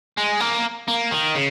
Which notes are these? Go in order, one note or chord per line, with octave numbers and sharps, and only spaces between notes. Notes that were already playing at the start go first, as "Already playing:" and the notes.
G#3
A#3
A#3
D#3
C#3